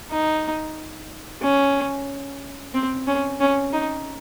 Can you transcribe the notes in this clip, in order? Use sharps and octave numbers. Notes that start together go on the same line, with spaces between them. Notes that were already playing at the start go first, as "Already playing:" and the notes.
D#4
C#4
C4
C#4
C#4
D#4